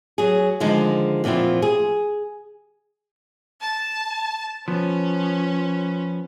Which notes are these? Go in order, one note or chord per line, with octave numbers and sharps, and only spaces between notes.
F#3 G#4
D3 D#3 F3 G#3 D#4
E2 A#2 F3 C4 E4
G#4
A5
F3 B3 C#4